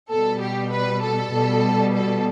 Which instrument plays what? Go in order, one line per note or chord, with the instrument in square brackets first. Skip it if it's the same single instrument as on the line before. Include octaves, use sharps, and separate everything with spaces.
[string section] B2 G3 A4
G4
B4
A4
B2 G3
A4